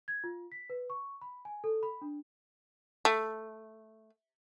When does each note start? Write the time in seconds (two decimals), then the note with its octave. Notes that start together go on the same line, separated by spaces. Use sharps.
0.08 G#6
0.24 F4
0.52 B6
0.70 B4
0.90 C#6
1.21 B5
1.45 G#5
1.64 A4
1.83 B5
2.02 D4
3.05 A3